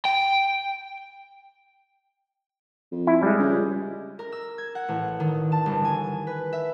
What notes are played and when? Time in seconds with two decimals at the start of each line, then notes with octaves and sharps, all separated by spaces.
0.05 G5
2.91 F2
3.07 E4
3.23 G3 G#3
3.39 C#2
4.19 A#4
4.32 E6
4.58 G#6
4.75 F#5
4.88 A1
5.20 D#3
5.52 A5
5.66 G1
5.85 G#5
6.27 B4
6.53 E5